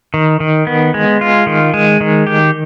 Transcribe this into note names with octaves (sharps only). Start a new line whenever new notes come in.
D#3
D#3
B3
G#3
F4
D#3
G#3
D#3
G4